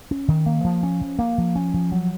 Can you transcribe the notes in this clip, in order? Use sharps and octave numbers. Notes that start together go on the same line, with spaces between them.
C#4
D#3
A#3
F3
C#4
F3
A#3
F3
C#4
F3
F#3